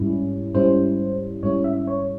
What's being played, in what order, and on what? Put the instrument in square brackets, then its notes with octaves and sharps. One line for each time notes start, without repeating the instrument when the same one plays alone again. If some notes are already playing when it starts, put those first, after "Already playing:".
Already playing: [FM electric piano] G#2 G3 C#4 E4
G#2 G3 C#4 E4 C5
G#2 G3 C#4 E4 C#5
E5
C#5